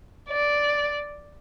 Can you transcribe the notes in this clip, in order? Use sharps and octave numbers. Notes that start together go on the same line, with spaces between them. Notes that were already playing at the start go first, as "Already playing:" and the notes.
D5